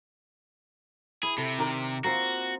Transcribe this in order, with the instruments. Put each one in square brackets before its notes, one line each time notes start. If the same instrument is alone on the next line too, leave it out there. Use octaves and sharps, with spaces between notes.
[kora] E4 [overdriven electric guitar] G#4
[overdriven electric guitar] C3 [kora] A4
[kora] D#3 A#4 D5
[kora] A#3 C4 F4 [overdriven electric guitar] F#4